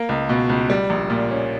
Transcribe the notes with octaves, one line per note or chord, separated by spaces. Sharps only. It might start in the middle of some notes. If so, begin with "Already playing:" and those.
Already playing: A#3
C#2
B2
C#2
G3
A#1
A#2
C#4